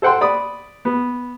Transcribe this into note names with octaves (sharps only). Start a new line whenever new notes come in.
A4 C5 F#5 G5 C6
D5 B5 D#6
B3